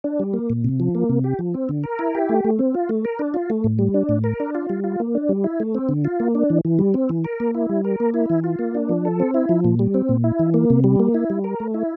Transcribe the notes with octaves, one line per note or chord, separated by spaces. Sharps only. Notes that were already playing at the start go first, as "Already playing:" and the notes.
D4
G3
A#3
A#2
C3
F3
A#3
C3
G4
F3
C4
D3
A#4
E4
G4
A3
A3
C4
F4
A3
A#4
D4
F4
A3
A2
G3
D4
A2
A#4
D4
F4
G3
F4
A#3
D4
G3
E4
A3
C4
D3
F4
A#3
D4
E3
E3
G3
C4
E3
A#4
A#3
E4
G3
A#4
A#3
E4
E3
F4
A#3
D4
F3
A4
C4
E4
F3
A#2
G3
C4
A#2
E4
E3
A#3
C3
G3
A#3
E4
G3
A#4
A3
E4